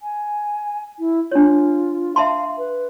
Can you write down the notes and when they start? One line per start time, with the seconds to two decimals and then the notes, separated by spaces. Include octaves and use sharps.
0.02 G#5
0.99 E4
1.32 D4 F4 C#5
2.16 E5 F5 A5 C6
2.58 B4